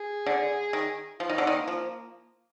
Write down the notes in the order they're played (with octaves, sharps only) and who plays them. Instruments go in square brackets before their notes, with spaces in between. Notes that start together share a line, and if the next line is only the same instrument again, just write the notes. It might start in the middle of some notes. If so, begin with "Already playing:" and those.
Already playing: [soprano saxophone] G#4
[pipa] D3
D#3
[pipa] F3 [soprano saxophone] F4
[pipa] D#3 [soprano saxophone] D#4
[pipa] D3
[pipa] D#3 [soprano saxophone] C4
[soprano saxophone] A#3
[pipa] F3